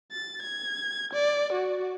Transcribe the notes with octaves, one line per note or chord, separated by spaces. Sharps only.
A6
G#6
D5
F#4